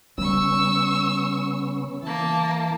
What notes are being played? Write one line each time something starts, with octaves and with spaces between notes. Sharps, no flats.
C#3 G3 B3 C#4 C#6 E6
E3 A#3 A5